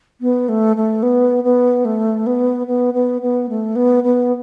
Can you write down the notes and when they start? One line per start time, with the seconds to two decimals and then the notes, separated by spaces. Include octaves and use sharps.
0.21 B3
0.49 A3
0.76 A3
1.03 B3
1.44 B3
1.85 A3
2.26 B3
2.67 B3
2.94 B3
3.22 B3
3.49 A3
3.76 B3
4.04 B3